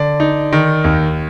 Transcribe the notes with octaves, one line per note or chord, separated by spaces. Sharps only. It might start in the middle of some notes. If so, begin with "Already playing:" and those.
Already playing: D3 D5
D#4
D#3
D#2